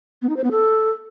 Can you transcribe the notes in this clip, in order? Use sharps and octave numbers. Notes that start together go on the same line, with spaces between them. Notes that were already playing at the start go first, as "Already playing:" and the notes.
B3
D#4
C5
B3
A4